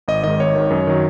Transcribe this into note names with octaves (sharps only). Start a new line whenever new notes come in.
G#1 D#5
G#2 D#3 D#5
G#1 C#5
G#2 D#3
F#2
D#3 F#3